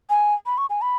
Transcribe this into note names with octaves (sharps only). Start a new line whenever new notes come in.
G#5
B5
C#6
G#5
B5